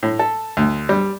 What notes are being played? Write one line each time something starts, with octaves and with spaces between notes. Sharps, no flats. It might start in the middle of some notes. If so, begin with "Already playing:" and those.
A2
A4
D2
G3